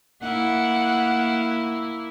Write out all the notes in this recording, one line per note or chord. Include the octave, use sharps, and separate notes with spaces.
A#3 E4 F#5